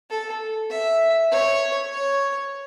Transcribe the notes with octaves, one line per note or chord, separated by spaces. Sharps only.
A4
E5
C#5
C#5